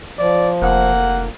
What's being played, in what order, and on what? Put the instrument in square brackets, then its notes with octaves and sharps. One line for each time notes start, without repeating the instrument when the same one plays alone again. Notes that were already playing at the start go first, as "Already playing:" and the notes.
[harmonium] F3 [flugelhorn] D5
[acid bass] F1 [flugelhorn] A#3 [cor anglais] F#5